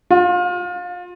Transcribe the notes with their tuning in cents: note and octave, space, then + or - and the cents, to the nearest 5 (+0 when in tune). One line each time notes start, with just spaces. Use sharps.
F4 +30